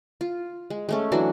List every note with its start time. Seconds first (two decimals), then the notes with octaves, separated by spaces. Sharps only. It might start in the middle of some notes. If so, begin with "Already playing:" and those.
0.21 F4
0.70 G#3
0.89 G#3 A3 C#4
1.12 E3 F#3 D4 F#4